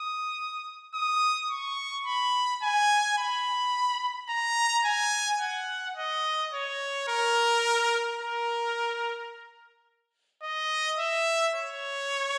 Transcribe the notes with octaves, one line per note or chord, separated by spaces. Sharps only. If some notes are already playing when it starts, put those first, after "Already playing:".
Already playing: D#6
D#6
C#6
B5
G#5
B5
A#5
G#5
F#5
D#5
C#5
A#4
A#4
D#5
E5
C#5